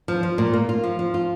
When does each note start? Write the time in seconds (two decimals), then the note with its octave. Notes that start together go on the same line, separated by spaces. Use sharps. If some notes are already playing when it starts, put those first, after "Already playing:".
0.08 F3
0.23 F3
0.38 A#2
0.53 A#3
0.69 F4
0.84 F3
0.99 F3
1.14 F4